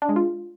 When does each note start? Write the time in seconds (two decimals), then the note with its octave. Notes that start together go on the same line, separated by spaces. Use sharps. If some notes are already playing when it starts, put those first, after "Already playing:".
0.02 D4
0.09 G#3
0.16 F4